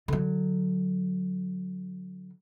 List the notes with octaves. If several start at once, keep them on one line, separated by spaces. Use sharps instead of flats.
D3 F#3